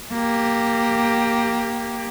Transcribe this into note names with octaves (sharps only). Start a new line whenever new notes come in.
A#3 G4